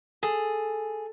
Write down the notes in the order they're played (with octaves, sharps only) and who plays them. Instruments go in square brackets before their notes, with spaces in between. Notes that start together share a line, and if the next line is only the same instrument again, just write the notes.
[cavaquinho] G#4 [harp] A4